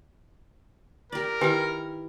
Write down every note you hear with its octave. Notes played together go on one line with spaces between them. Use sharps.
G4 A#4 D5
D#3 D#4 E4 G4 B4 G5